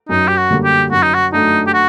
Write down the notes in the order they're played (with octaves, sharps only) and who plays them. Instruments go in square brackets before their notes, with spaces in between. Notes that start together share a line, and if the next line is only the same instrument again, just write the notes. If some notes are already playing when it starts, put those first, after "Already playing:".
[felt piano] F#2 [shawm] D#4
[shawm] G4
F#4
[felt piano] D3 G3 A#3
[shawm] G4
[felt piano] F#2 [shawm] F#4
[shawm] D#4
F#4
[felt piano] F#3 A3 D4 [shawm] D#4
[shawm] G4
F#4